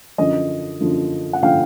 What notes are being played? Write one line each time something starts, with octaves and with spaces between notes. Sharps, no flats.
F#2 D3 F3 D#5
F#2 D3 F3
F#5
D3 F3 F5 G5